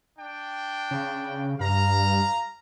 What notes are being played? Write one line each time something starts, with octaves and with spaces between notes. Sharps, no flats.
D4 G5
C#3
G2 F5 A#5